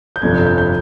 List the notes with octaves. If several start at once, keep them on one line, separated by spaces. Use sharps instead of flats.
G6
G1 F2 C3 F3 G#6
G6
G6
G6